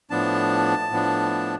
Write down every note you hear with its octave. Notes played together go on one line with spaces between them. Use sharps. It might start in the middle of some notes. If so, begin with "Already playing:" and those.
A2 F3 B3 D4 A5
A2 F3 B3 D4